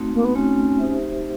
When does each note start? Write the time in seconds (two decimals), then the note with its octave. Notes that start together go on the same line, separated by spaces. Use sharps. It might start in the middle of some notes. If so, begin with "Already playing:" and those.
Already playing: A3 C4 D#4 F#4
0.14 A#3
0.25 B3
0.35 A3 C4 C#4 D#4 F#4
0.78 D#4 G4 C5 E5